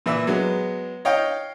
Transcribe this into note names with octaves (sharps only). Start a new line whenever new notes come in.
A#2 E3 E5
F#3 G#3 B3
C#5 D#5 F5 G5